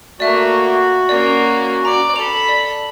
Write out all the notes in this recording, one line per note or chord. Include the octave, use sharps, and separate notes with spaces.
A3 A#3 F#4 D5 E5
A#3 C#4 D5
D5 A#5
A4 B5 F7
D5